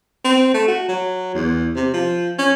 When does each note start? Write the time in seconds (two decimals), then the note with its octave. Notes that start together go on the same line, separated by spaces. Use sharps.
0.24 C4
0.54 A3
0.68 F#4
0.89 F#3
1.35 E2
1.76 C3
1.94 F3
2.39 C#4